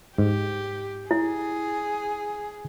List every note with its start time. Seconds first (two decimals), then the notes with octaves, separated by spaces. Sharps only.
0.18 G#2 G4
1.11 E4 G#4